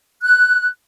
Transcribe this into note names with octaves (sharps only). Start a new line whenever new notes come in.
F#6